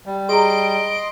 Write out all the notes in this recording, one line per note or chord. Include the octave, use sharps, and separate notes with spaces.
G3
G#4 D#5 A#5 C6 D7